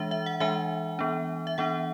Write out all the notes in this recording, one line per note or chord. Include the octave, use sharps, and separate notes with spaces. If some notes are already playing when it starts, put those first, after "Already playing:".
Already playing: E3 G#3 D4 E5
E5
F#5
E3 G#3 D4 E5 G#5
E3 B3 D4
E5
E3 B3 D4 F#5